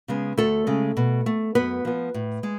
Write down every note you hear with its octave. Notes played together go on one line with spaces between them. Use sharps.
C#3 G#3 B3
D2 A3 A4
C#3 G#3
B2
A3
F#2 B3 B4
F3 B3
A2
G#3